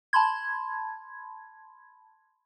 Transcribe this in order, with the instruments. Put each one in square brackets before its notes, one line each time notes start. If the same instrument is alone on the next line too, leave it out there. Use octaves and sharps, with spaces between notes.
[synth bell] A5 B5 C6 G#6